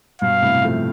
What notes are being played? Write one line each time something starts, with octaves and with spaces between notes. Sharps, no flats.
G2 B2 F5
A2 C3
F3 A3